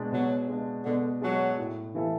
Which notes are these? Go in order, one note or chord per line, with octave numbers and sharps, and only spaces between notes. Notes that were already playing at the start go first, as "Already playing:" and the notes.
Already playing: B2 G#3 D4
B2 F#3
G#3 D4
B2 D3
F#3 G#3 D4
A2
E3 A3 E4 A4